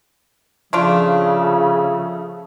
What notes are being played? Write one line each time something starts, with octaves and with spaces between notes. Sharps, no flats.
C#3 F3 A3 D4 F4